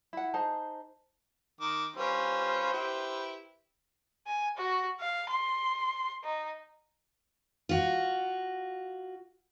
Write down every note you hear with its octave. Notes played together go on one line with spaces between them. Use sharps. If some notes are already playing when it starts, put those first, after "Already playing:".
E4 F#5
D#4 G#4 C5 A5
D#3 D6
G3 C#4 F4 B4 C5
E4 G4
G#5
F#4
F5
C6
D#4
F4 F#4